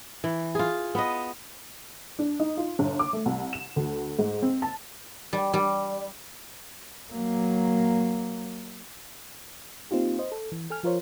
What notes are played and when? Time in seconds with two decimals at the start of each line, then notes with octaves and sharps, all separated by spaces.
0.24 E3
0.55 F4 G#4
0.95 B3 B4 D#5
2.19 D4
2.40 D#4
2.57 F4
2.79 G1
2.99 D6
3.13 A3
3.26 C2
3.53 E7
3.76 D2
4.19 G#2
4.42 C4
4.62 A5
5.33 G3
5.53 G3
7.13 F#3 A#3
9.91 A#3 C4 D#4 F4 G4
10.19 C5 D#5
10.32 A4
10.52 E3
10.70 A4 G#5 F6
10.83 F3 F4 A#4 C5 C#5